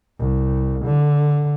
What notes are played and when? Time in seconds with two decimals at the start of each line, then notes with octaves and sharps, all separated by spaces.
0.19 C2
0.85 D3